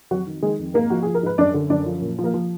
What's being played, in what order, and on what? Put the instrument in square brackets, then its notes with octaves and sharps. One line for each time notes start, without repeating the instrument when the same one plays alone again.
[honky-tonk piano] F2 F#3 F#4
D#3
D#3 G#3 G#4
F2
G#2 A#3 A#4
F3 F#4
F3 G#4
A#4
G#2 B4
F#2 D4 D5
D3
F#2 D4 D5
F3
A#2
F3
A#3 A#4
F3